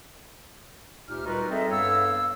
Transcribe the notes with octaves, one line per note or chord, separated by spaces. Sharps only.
D2 A#2 D#4 G4 F6
G3 D#4 F4 F#4 A#4 B4
G3 C4 G#4 A4 D#5 E5
G2 B3 A4 C#5 F5 E6